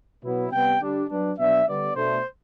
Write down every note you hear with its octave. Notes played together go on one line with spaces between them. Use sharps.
B2 F#3 B3 E4
C3 G3 B3 G5
D3 G3 D4
F#3 B3 D4
B2 F#3 B3 D4 E5
D3 G3 B3 D5
B2 A3 D4 C5